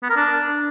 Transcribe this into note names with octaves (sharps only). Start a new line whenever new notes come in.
B3
A#4
D4